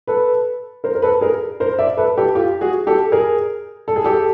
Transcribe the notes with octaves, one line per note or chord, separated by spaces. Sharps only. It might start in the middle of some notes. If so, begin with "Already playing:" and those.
A4 B4
A#4 C5
A#4
A4 B4
G#4 A#4
A#4 C5
D5 E5
A4 B4
G4 A4
F4 G4
F#4 G#4
G4 A4
G#4 A#4
A4
G#4
G4 A4